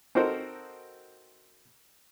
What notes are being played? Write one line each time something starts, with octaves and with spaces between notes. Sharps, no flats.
C4 D#4 F#4 A4 A#4 C5